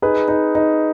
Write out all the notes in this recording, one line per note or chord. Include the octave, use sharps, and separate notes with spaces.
D#4 G#4 B4
D#4
D#4